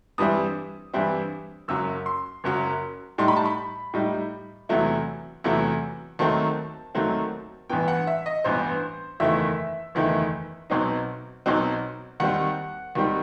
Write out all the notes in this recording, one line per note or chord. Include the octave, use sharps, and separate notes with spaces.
G2 E3 G3 C4 E4 D#6
G2 E3 G3 C4 E4
F#1 F#2 F#3 E6
C6
F#1 F#2 F#3
A2 G3 D#4 C6
B5
A5
B5
A2 G3 D#4
E2 C3 F#3 A3 E4
E2 C3 F#3 A3 E4
D#2 D#3 F#3 A3 C4 A5
D#2 D#3 F#3 A3 C4
A1 G2 E3 B3 G5
F#5
E5
D#5
A1 G2 E3 B3 C5
F#1 E2 D#3 A3 E4 E5
F#1 E2 D#3 A3 E4
B1 B2 F#3 C4 D#4
B1 B2 F#3 C4 D#4
D#2 D#3 G3 C4 F#5
D#2 D#3 G3 C4